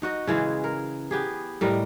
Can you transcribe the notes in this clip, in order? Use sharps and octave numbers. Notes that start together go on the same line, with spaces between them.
D#4 F#4 D#5
C#3 E3 G#3 G#4
A#4
B3 G4 G#4
A2 G3 A#4 D#5